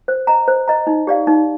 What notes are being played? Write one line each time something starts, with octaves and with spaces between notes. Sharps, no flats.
C5
D#5 A#5
C5
D#5 A#5
D#4
G4 D5 F5
D#4